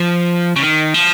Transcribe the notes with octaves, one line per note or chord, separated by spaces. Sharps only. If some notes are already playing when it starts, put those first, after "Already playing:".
Already playing: F3
C#3
D#3
F3